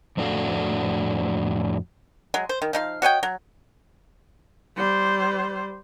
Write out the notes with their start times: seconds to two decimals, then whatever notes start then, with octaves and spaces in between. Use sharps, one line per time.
0.17 F2 A2 D4 F#4 A4 F5
2.34 F#3 G#3
2.49 C5
2.62 D#3
2.73 F3 D#4 F5
3.02 F#4 C#5 D#5 G5
3.23 F#3
4.76 G3 C5